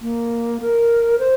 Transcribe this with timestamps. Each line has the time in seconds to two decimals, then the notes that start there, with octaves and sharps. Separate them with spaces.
0.01 A#3
0.61 A#4
1.19 C5